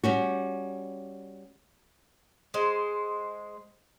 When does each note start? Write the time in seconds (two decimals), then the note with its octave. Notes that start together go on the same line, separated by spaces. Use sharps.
0.03 G3 C#4 F#4
2.54 G#3 C5